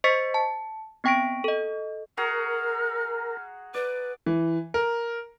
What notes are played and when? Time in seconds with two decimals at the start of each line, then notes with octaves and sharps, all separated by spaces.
0.04 C5 D#5 C#6 A6 B6 C#7
0.34 A5
1.04 B3 C4 G5 C#6 A#6 D7
1.44 A4 D#5
2.17 F#4 G#4 A#4 A#5 F6
3.74 B4 D5
4.26 E3
4.74 A#4